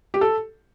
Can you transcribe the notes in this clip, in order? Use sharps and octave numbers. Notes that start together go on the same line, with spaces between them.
G4
A4